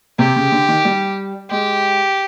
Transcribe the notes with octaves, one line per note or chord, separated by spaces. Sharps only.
C3 G4
C#3
D3
D#3
G3
G#3 G4